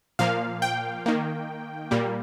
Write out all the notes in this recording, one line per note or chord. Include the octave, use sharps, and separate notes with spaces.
A#2 F3 A#3 F5
G5
D#3 A#3
A#2 G3 A#3